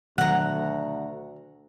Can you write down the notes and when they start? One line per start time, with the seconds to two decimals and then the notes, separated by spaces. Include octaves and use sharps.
0.18 D2 B2 D#3 F#3 F#5 A#5